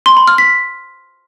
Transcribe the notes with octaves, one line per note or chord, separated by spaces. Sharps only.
C6
B5
F6
B6